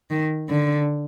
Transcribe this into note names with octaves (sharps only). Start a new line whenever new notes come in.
D#3
D3